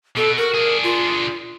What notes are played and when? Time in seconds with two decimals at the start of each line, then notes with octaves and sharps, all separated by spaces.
0.16 B2 A4
0.37 F#4 A#4
0.54 D4 G#4
0.83 F4